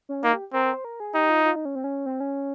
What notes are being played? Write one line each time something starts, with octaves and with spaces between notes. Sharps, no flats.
C#4
A#3 D#4
G4
C4 A#4
A#4
C5
A#4
G#4
D#4 G4
F4
F4
D#4
C#4
C4
C#4
C4
C#4